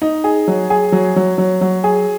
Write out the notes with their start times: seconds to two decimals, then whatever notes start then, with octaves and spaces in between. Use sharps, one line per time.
0.02 D#4
0.24 G#4
0.48 F#3
0.70 G#4
0.92 F#3
1.16 F#3
1.38 F#3
1.61 F#3
1.84 G#4